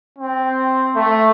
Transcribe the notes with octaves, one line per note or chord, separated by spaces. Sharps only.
C4
A3